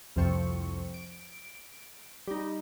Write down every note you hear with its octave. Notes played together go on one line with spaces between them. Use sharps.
C2 F2 F3 C4 C#6
D7
G3 D#4